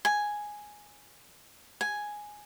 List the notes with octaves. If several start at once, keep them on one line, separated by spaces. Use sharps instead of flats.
G#5
G#5